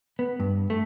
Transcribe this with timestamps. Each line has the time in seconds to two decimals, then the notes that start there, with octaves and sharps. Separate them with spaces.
0.19 B3
0.40 G2
0.70 A3